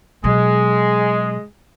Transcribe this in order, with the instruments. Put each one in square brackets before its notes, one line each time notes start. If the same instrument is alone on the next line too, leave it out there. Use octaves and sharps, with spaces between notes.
[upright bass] B2 F#3 [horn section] G#3